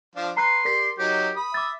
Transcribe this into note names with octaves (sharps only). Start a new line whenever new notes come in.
F3 D4 F4
B4 A#5 C6 F#6 C7
G4 A#4 D5 B6
F#3 D#4 G4
B5 D#6
E5 D6 A6